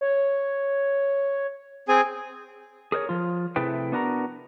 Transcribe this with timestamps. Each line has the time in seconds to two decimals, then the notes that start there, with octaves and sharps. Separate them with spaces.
0.01 C#5
1.88 C4 G#4 G#5
2.92 G#4 A#4 C5 C#5
3.09 F3 F4
3.56 C3 A3 E4 G#4 B4 G5
3.92 B3 D4 F#4 A#4 A#5